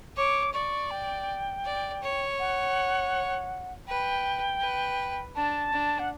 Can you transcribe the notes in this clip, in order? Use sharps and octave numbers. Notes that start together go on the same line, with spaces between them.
C#5 D6
D5 C#6
G5
D5
C#5
F#5
B4 G5
B4
D4 A5
D4
F#5